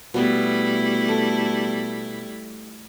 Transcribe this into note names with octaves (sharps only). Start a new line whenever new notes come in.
B2 G3 A3 B3 E4
A4